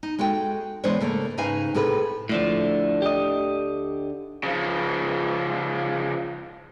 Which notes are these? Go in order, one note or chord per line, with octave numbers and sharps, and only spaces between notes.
D#4
G#3 F#4 A4 G5
E3 G#3 B3 D4 C5 C#5
C#3 A3 A#3
G#2 C#3 D#4 B4 F5 G#5
A2 C3 G#4 A4 B4
D2 A2 D3 F3
G4 D#5
C#3 F3